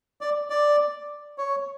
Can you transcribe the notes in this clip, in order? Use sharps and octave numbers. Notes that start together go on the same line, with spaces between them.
D5
D5
C#5